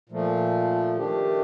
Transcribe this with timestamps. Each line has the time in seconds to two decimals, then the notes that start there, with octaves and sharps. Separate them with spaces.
0.09 A#2 F3 A3
0.96 D#3 A3 D4 G4